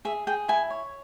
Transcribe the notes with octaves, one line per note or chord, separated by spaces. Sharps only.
G#4 E5
G#4 G5
E4 G#5
C#5